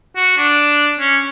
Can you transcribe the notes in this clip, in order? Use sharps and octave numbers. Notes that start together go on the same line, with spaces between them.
F#4
D4
C#4